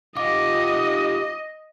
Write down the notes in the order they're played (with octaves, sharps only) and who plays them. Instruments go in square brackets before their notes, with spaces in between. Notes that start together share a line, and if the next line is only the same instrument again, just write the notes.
[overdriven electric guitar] F4 G4 [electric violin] D#5 [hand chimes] D6